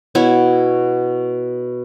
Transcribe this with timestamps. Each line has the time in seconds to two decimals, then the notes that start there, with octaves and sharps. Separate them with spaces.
0.15 B2 E4 F#4 C#5